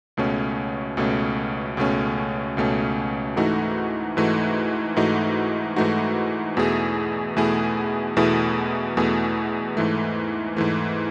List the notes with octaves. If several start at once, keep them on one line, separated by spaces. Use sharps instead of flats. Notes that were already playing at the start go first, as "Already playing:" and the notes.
C#2 B2 A3 C#4
C#2 B2 A3 C#4
C#2 B2 A3 C#4
C#2 B2 A3 C#4
G#2 E3 A3 D#4 F#4
G#2 E3 A3 D#4 F#4
G#2 E3 A3 D#4 F#4
G#2 E3 A3 D#4 F#4
E2 B2 A3 E4 G#4
E2 B2 A3 E4 G#4
E2 B2 A3 E4 G#4
E2 B2 A3 E4 G#4
G#2 E3 A3
G#2 E3 A3